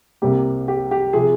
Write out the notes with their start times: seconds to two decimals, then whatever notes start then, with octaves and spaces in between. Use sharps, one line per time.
0.22 C2 C3 G3 A#3 G4
0.68 G4
0.91 G4
1.13 C3 F3 C4 G#4